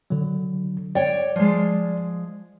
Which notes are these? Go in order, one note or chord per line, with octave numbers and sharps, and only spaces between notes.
D3 F#3
C#5 D5 G5
F3 G#3